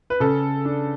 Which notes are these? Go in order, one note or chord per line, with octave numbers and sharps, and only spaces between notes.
B4
C#3 A4
D4